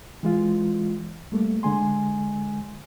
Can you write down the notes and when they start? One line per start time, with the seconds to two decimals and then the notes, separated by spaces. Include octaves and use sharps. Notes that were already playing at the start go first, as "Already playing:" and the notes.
0.23 E3 G#3 F4
1.32 G3 A3 A#3
1.63 D3 G#3 G#5 C6